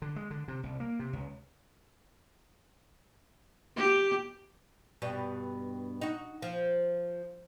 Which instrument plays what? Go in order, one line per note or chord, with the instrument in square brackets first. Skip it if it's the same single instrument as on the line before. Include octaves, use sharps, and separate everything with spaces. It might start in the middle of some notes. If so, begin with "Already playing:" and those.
[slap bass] D3
G#3
D3
C3
C2
A#3
C3
C#2
[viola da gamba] G4
[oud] G2 B2 G3
D#4 F#4
F3